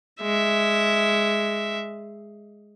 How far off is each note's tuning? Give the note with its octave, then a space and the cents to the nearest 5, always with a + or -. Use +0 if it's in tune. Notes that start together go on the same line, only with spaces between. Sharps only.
G#3 +0 E5 +0